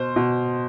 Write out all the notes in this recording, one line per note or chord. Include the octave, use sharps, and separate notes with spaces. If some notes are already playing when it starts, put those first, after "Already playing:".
Already playing: B2 C5
B2